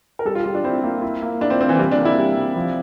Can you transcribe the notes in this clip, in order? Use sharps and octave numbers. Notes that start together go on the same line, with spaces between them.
A#4
G3 A4
F4
G3 F4
D4
C4 E4
A#3
E4
A#3
D4 E4
C4
A#3 C4
E3
C3 G3
D4
A#3
E4
G3
C3
F3